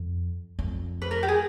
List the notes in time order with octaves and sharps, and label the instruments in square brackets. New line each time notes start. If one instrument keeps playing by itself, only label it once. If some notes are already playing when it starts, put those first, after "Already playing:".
Already playing: [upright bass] F2
F2
[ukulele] B4
A#4
G4
G#4